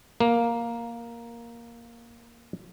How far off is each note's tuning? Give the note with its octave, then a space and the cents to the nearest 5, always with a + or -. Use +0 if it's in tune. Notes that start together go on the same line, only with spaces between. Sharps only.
A#3 +5